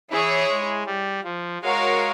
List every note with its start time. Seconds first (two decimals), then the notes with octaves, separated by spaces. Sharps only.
0.10 E3 E4 G#4 C#5
0.49 G#3
0.86 G3
1.24 F3
1.62 G#3 F#4 A#4 C#5 F5